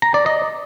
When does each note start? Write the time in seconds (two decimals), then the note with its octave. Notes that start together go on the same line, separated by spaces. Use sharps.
0.02 A#5
0.14 D5
0.26 D#5